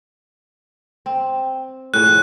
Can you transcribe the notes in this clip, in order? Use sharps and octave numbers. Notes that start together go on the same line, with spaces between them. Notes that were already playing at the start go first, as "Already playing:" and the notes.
C4
A2 C#3 F3 F#6